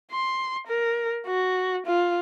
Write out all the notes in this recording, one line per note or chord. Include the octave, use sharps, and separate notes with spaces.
C6
A#4
F#4
F4